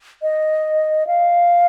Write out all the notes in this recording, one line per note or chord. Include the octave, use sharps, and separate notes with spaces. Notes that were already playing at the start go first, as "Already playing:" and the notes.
D#5
F5